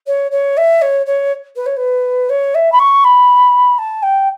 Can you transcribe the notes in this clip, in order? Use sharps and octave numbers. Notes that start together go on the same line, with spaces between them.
C#5
C#5
E5
C#5
C#5
B4
C#5
B4
C#5
E5
B5
C#6
B5
A5
G5